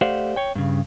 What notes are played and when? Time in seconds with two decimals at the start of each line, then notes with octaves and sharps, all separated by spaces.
0.01 A3 G4 C5 D5 F5 F#5
0.36 C#5 G5
0.55 G2 C#3